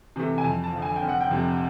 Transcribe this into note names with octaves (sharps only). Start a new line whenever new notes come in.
C3 E3 A3
G#5
F2 A5
A5
D3 F3
G#5
G5
F1
F#5
G5
F2 C3